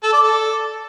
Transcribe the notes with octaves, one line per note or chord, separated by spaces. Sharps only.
A4
D5
A4